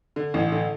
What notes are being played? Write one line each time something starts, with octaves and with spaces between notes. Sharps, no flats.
D3
A1
D3